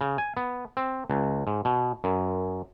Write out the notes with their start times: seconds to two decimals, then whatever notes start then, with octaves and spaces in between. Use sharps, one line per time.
0.01 C#3
0.18 G#5
0.37 B3
0.77 C4
1.10 C#2
1.47 G#2
1.65 B2
2.04 F#2